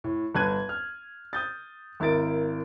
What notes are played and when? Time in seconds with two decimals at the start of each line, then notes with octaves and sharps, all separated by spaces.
0.04 A2
0.35 G1 A5 F#6 G#6 D#7
0.69 F6
1.33 D#6 G6 A6
2.00 G#1 E4 A#4 A6 D7